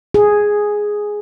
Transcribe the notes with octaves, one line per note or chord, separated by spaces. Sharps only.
G#4